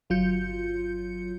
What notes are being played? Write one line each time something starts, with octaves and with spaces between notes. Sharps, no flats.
G1 F#3 F4 G6 C#7